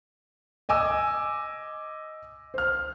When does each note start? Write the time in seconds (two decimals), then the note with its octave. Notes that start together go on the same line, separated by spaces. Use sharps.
0.69 D#5 G#5 D6 E6
2.54 C5 F6